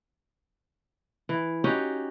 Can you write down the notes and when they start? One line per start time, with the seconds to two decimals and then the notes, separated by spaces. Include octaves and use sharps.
1.29 E3
1.64 C#4 D#4 F#4 G4